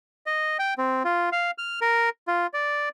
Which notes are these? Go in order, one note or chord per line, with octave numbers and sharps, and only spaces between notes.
D#5
G5
C4
F4
F5
F6
A#4
F4
D5